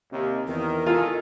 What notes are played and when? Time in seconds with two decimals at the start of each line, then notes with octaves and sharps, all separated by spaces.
0.12 D#2 C3
0.47 E2 D#3 A#4
0.86 D#3 F4 G#4 A4